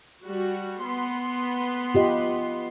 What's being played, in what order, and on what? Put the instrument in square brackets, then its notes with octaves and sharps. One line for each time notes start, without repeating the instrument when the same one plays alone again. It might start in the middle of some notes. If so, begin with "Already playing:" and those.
[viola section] G3 F#4
B3 C6
[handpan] F4 G4 D#5